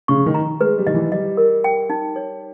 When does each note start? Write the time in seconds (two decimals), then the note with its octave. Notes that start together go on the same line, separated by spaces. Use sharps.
0.08 C#3 C#6
0.26 D#3
0.34 A#5
0.61 G#3 B4
0.78 G3
0.87 D#3 D#5
0.94 E3
1.12 G3 D#5
1.37 A#4
1.64 G5
1.90 D#4
2.16 C#5